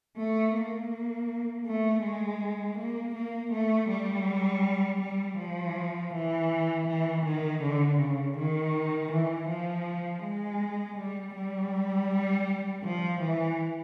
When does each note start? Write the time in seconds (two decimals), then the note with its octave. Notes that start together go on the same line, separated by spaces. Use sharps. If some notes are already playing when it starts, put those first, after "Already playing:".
0.17 A3
0.54 A#3
1.66 A3
2.03 G#3
2.78 A#3
3.15 A#3
3.52 A3
3.89 G3
5.01 G3
5.38 F3
6.14 E3
6.88 E3
7.25 D#3
7.63 D3
7.99 C#3
8.37 D#3
9.12 E3
9.49 F3
10.23 G#3
10.98 G3
11.35 G3
12.84 F3
13.21 E3